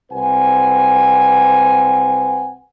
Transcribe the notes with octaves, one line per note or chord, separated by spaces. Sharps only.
C2 C4 B4 F#5 G#5